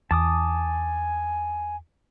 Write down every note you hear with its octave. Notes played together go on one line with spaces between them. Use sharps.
E2 G#5 A5 D6 D#6